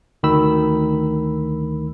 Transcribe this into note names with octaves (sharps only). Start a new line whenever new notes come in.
D2 D#3 B5 E6